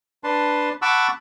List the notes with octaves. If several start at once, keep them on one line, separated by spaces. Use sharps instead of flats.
D4 B4 A5 C6
F#5 A5 B5 C#6 D6 E6